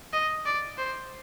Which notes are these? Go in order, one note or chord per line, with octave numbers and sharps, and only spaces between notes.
D#5
D5
C5